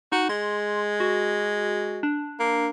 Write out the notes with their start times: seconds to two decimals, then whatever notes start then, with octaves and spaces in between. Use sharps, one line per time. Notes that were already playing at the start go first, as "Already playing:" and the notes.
0.12 D#4 F#4
0.29 G#3 C6
1.00 F#4
2.03 D4
2.40 A#3